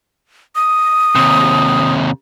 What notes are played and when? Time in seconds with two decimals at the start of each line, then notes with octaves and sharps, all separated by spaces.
0.55 D#6
1.15 D#2 C3